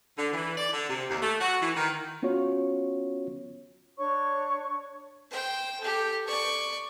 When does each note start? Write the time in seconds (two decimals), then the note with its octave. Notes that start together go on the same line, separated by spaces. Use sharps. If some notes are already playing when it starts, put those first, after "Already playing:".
0.18 D3
0.33 E3
0.57 D5
0.73 D3
0.89 C3
1.10 D#2
1.22 A3
1.40 F#4
1.62 E3
1.77 D#3
2.22 B3 C#4 F4 F#4 C#5
3.98 D4 C#5 C#6
5.31 C5 G5
5.80 G4 A4
6.27 D5 C#6